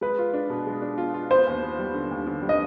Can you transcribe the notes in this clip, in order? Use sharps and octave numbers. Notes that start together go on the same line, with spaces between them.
G#3 B4
F4
D4
B2
G#3
D4
F4
F4
B3 C5
D#2
B3
G3
D3
D#2
D3
G3
D#5